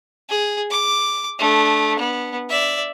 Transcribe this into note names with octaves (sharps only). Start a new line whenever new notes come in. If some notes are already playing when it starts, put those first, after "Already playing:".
G#4
D6
A3 D4
B3
D5 E5